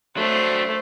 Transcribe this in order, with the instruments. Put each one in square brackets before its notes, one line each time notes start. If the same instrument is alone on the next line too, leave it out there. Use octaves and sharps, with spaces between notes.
[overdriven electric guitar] F#3 D4 [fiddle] A3 [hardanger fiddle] C5